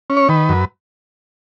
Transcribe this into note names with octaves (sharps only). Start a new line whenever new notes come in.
C#4
C#5
D#3 B4
F#2